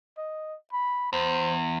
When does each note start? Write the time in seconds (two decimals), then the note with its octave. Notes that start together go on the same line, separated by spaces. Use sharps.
0.18 D#5
0.73 B5
1.13 E2 C5